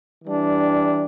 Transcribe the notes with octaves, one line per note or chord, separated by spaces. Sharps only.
E3 G3 D4